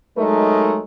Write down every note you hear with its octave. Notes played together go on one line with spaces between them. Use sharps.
F#3 G#3 A3 D#4 A#4 D#5